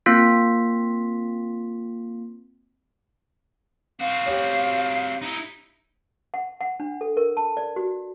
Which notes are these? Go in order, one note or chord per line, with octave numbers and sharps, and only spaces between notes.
A#3 C4 F4 B6
C4 F#4 F5
G4 C#5
D#4 E4
F#5
F#5
D4
A4
A#4
A5
D5
F#4